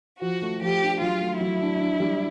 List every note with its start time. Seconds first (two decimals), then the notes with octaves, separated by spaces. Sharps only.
0.21 F3 F#4
0.42 A3
0.62 F3 G4
0.82 D4
1.01 F#3 F4
1.21 A3
1.40 F#3 E4
1.61 D4
1.80 D4
2.00 G3